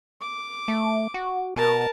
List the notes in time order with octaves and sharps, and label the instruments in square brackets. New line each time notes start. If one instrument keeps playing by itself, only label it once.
[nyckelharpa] D6
[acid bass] A3
F#4
[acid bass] B2 [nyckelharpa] A#4 A5